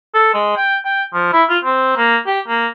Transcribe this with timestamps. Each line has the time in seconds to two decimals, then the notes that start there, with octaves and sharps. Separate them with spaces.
0.15 A4
0.34 G#3
0.57 G5
0.85 G5
1.13 F3
1.33 E4
1.50 F4
1.64 C4
1.97 A#3
2.27 G4
2.48 A#3